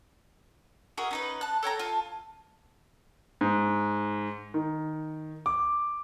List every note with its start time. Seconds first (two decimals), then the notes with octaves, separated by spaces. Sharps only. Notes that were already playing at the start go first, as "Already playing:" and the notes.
0.97 F#4 G#4 A#4 E5
1.11 C#4 D#4 B4
1.41 A5 F#6
1.63 A4 C#5 G5 A#5
1.79 F4 A5
3.41 G#2
4.54 D#3
5.46 D6